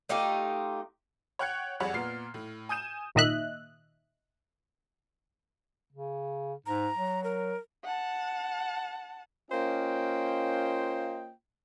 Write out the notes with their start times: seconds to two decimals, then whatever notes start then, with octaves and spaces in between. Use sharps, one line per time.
0.09 A3 D#4 F4 G4
1.39 C#5 F#5 G5 F#6 G#6 C#7
1.80 F2 G3 G#4 C#5 F#5 B5
1.94 A#2 B3 F6 C7
2.34 A2
2.69 G#5 D#6 G6 D#7 E7
3.15 G#1 A#2 D#3 D#5 E5 F#6
5.93 C#3
6.66 G#2 A#5
6.97 F#3
7.24 A#4
7.85 F#5 A5
9.51 A#3 C#4 F4 C5 D#5 G5